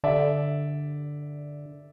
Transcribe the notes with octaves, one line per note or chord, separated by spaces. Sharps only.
D3 D5 E5